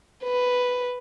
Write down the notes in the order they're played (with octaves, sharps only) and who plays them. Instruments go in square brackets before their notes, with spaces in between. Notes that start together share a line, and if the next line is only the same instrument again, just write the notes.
[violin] B4